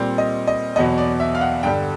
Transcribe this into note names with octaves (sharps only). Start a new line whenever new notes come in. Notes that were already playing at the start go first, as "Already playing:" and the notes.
Already playing: A#2 G3 C4
D#5
D#5
E2 B2 F#3 B3 D#5
D5
E5
F5
F#5
G2 D3 G3 G5